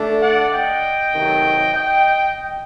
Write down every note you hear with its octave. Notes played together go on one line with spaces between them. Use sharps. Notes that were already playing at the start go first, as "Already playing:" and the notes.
Already playing: D3 A3 D4
D5 F#5
D#5 G5
C3 D#3 F#3 A3
D#5 G5